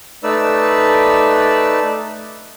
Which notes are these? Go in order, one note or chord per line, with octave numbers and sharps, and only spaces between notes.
A3 D#4 B4 D5 E6